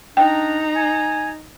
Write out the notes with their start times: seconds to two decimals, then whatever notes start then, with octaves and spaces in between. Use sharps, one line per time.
0.17 D4 D#4 G5 A#5
0.75 G#5